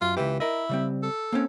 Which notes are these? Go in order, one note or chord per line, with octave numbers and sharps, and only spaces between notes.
F#2 F4
C#2 E3 G4
E4 A#4 D#5
C#3 G3 C4
A4
A#3 C4 C#4